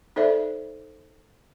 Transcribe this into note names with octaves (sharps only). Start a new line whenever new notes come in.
D#4 A4 C5 D5 E5